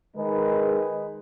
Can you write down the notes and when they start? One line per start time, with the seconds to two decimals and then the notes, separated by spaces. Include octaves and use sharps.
0.15 D#3 G#3 D#4 G#4 B4